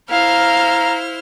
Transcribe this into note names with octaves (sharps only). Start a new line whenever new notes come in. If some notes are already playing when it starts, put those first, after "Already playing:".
E4 C5 F5 A#5 F6